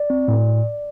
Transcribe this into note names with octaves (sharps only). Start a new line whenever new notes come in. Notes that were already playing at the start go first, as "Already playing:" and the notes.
Already playing: D5
C4
A2